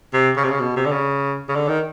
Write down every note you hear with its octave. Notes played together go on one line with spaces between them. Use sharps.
C3
C#3
C3
C#3
B2
C3
D3
C#3
C#3
D3
D#3